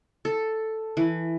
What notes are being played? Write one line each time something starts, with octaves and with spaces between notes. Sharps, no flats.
A4
E3